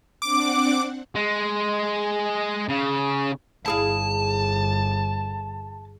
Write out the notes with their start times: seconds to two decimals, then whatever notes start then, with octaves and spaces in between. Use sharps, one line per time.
0.22 C4 D4 F#5 D6
1.15 G#3
2.69 C#3
3.66 G1 E4 G#4 F5 A5